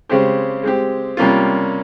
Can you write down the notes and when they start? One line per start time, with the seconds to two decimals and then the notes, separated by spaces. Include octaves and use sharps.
0.09 C#3 G#3 C4 G4 C5
0.63 G#3 C4 G4
1.17 C3 G3 A#3 C#4 F4